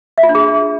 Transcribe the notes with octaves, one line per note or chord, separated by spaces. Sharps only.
E5
F4
D4
G#4